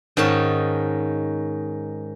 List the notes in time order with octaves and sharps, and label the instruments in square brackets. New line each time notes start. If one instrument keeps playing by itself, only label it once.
[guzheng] G#2 D#3 C#4 A5